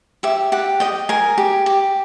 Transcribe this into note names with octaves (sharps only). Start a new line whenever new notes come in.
G4 E5
G4 F#5
D#5 G5
A#4 G#5
G4
G4